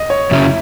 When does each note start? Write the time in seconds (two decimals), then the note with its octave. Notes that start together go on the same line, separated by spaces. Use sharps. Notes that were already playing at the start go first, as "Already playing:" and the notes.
Already playing: D#5
0.10 C#5
0.31 F#2 C#3 F#3 C#4 E4
0.45 E4